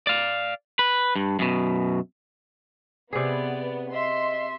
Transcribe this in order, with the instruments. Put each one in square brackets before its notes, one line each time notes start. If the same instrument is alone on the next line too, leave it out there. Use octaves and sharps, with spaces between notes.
[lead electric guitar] D5 F5
B4
G2
F#2 B2
[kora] C3 G#4 [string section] B3 [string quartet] D5
[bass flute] D#5 [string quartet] E5 [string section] C6